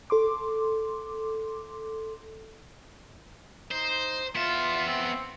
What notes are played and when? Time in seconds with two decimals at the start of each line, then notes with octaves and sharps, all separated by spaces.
0.10 A4 C6 D6
3.71 D#4 C5
4.36 B3 F4 E5
4.87 C4